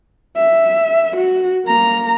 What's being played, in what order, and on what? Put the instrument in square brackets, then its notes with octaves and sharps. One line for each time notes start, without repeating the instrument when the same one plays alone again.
[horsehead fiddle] E5
F#4
A#3 A#5